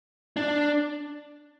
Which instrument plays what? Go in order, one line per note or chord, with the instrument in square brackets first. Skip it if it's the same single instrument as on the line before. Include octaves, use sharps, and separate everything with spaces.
[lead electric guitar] D4